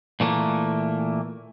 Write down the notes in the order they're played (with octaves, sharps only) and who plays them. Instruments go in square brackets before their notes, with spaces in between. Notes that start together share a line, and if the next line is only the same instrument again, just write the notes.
[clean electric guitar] A#2 E3 A3 A#3